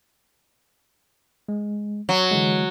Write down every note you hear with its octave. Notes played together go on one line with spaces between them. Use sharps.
G#3
F#3
D3 E3 G#3